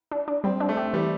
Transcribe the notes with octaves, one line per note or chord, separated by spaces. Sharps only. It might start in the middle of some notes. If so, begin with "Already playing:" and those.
D4
D4
G3 C4
D4
A3
G4
E3 G3